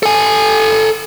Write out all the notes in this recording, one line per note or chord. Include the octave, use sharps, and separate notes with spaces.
A4 G#5